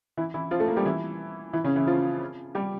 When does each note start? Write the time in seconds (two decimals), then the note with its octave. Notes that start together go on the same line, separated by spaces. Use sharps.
0.17 E3 E4
0.34 E3 E4
0.51 F3 F4
0.60 A3 A4
0.68 A#3 A#4
0.77 G3 G4
0.85 E3 E4
1.53 E3 E4
1.64 C#3 C#4
1.76 E3 E4
1.87 F3 F4
2.55 G3 G4